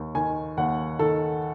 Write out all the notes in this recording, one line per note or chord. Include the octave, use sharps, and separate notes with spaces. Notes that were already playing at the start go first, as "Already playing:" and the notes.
Already playing: D#2
D#3 G#5
D#2 F#5
D#3 A4